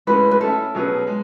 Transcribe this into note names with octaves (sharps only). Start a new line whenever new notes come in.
A2 G#3 C#4 B4
B4
A3 C#4 E4 A4
B2 F#3 C#4 G#4 B4
G#3